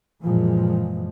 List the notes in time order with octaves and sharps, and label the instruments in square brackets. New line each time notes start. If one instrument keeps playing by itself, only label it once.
[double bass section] F#2 A#2 E3 F3 G#3